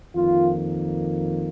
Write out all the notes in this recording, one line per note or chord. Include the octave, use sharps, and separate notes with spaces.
F2 D#3 A#3 F4